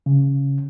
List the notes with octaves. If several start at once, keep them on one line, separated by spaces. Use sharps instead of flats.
C#3